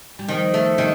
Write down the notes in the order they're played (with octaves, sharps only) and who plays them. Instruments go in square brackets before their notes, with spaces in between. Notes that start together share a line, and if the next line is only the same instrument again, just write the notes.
[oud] G3
[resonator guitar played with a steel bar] D#3 [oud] F3
[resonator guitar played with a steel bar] A3
[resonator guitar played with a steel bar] D#3 [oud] G3